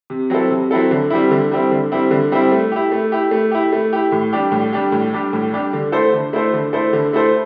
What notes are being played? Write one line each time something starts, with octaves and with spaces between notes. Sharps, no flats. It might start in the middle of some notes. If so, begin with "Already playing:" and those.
C3
F#3 C4 E4 A4
C3
F#3 C4 E4 A4
D3
G3 C4 E4
D3
G3 C4 E4
D3
G3 C4 E4
D3
G3 C4 E4
A3
E4 G4
A3
E4 G4
A3
E4 G4
A3
E4 G4
A2
G3 D4 G4
A2
G3 D4 G4
A2
G3 D4 G4
A2
G3 D4 G4
D3
A3 E4 A4 C5
D3
A3 E4 A4 C5
D3
A3 E4 A4 C5
D3
A3 E4 A4 C5